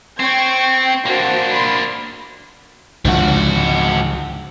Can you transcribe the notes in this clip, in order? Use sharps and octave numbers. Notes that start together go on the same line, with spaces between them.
C4 G5 C#6 G#6
A#3 D4 F#4 C5
B5 C6
C#2 G#2 D3 F3 F#4